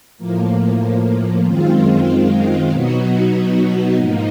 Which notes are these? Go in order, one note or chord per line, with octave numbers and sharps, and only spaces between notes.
A2 F3 A#3
F#2 D#3 G#3 C4 F4
B2 F#3 B3 D#4 F#4
G#2 F3 A#3 D#4